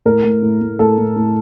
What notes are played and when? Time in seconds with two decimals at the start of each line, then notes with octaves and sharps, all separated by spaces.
0.05 A2 A#4
0.24 A2
0.43 A2
0.61 A2
0.79 A2 A4
0.98 A2
1.16 A2